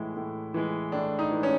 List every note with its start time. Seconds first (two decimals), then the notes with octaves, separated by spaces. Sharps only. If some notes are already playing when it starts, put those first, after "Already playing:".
Already playing: A2 E3 G#3 E4
0.17 A2
0.54 E3 G#3
0.92 A2 D4
1.19 D#4
1.31 E3 G#3
1.43 C#4